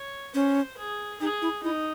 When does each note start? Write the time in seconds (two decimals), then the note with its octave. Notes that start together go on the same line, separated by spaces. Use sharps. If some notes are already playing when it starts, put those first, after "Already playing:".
Already playing: C#5
0.34 C#4 C5
0.77 G#4
1.20 D#4 G#4
1.42 E4
1.63 D#4 E4